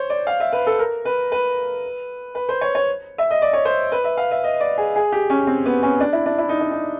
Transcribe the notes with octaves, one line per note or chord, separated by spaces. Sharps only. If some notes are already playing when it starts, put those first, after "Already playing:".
Already playing: C5 C#5
D5
F5
E5
B4
A4
A#4
B4
B4
B4
C5
C#5
C#5
E5
D#5
D5
C#5
C5
B4
E5
F5
E5
D#5
D5
G#4
G#4
G4
C#4
C4
B3
C#4
D4
E4
D4
E4
D#4
D4
D#4